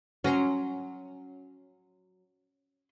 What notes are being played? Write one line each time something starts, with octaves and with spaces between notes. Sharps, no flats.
F#3 C#4 A#5 C6